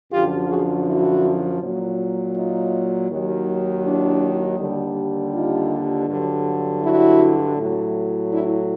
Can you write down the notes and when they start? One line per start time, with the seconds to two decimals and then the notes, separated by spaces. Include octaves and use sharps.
0.12 F#2 D3 F3 F4 G4
0.49 F#4 G#4
0.86 E4 F#4
1.61 A#2 F#3
2.35 D#4 F4
3.09 D#2 D#3 F#3
3.84 D4 E4
4.58 D#2 D3 G3
5.33 D#4 F4
6.08 G2 D3 F#3
6.82 E4 F#4
7.57 A2 F#3
8.32 D4 E4